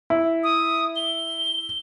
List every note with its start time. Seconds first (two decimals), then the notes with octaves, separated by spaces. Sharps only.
0.10 E4
0.43 D#6
0.96 G7